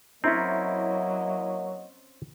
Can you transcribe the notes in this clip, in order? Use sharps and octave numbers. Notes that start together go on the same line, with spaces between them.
F#3 A#3 C4 C#4 E4 C#5 D#5 A#5